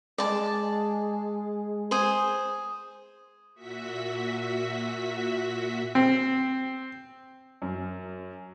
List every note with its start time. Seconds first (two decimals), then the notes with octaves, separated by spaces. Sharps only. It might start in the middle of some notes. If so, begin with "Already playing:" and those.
0.18 G#3 D5 A5
1.91 G#4 C5
3.55 A#2 F#4 E5 B6
5.95 C4
7.62 F#2